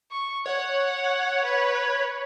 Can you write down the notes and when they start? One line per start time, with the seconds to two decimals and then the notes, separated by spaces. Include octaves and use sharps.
0.11 C#6
0.46 C#5 F#5
1.44 B4